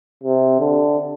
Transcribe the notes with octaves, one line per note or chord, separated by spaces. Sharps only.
C3
D3